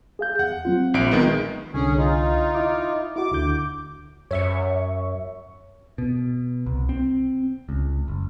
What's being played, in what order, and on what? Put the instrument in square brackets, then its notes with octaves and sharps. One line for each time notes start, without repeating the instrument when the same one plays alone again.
[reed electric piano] G#4 F5 G6
[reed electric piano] E2 [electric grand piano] F#5
[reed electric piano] F#3 C4 F4
[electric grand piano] A#1 D7
D#3 G#3 B3
[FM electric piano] C2 D3 [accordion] C#4 G#4
[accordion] D#4 F4
[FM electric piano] E4 D6
[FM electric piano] E4 F#4 [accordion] D6
[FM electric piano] D2 D3 G6
[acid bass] F#2 [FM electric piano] C#5 E5 C#6
[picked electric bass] B2
C2
C4
C#2
F#1